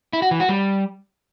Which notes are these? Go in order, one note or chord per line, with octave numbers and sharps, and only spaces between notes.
E4
F#4
E3
F#4
G3